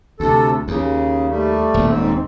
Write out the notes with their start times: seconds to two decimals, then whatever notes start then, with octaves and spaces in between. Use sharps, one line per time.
0.20 D2 C3 A4
0.68 D#2 C#3
1.29 G3 A3
1.74 D#1 D#2
1.88 G#2 C4